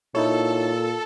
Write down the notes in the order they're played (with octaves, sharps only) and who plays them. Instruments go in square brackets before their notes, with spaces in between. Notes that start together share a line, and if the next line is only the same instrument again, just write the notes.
[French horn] A#2 [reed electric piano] D#4 E4 C#5 [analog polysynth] A4